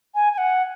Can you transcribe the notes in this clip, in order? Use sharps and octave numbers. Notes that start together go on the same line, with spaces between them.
G#5
G#5
F#5